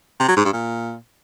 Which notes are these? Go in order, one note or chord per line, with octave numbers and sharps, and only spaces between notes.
C3
F#3
G#2
G2
A#2